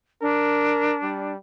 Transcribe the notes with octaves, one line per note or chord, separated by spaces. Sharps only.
D4 A#4
G3